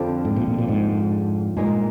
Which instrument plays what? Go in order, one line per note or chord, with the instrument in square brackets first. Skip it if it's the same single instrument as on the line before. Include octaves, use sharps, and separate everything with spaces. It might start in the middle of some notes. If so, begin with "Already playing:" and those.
Already playing: [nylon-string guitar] F2 D3 F3
[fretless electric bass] G#2
A#2
A#2
A#2
G#2
[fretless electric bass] G2 [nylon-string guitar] A#2 G#3 D#4